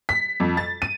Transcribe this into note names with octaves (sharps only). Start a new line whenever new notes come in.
B6
F2
A6
D#7